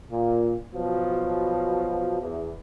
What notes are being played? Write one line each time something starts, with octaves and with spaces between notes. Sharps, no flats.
A#2
B2 F3 F#3
E2